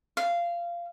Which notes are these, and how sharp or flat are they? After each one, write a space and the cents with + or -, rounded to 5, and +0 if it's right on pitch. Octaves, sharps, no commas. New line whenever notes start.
F5 -15